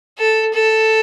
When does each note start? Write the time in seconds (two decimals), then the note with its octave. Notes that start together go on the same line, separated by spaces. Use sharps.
0.18 A4
0.54 A4